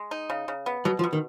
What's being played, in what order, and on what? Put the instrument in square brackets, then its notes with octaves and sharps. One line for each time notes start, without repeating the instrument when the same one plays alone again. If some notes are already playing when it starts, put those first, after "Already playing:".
Already playing: [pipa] G#3
D#4
C#3
C#3
B3
[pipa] B2 [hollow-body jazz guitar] F#3
[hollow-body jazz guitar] F3
[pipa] B2
[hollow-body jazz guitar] D#3